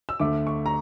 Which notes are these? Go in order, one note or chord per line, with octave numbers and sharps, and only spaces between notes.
E6
D2 D3 A3 D6
C#6
A#5